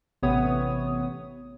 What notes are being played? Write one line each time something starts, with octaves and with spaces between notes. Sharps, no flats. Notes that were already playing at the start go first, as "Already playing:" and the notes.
A1 C3 B3 C#5 D#6